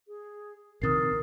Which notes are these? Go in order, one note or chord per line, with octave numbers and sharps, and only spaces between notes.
G#4
A#1 C3 D#3 A#4 D#6 A6 C7